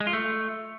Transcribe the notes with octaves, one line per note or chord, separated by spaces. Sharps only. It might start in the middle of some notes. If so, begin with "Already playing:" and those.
G#3
F4
A3